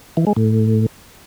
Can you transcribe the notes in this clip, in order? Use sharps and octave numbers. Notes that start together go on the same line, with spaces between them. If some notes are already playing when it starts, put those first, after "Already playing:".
E3
G#3
A2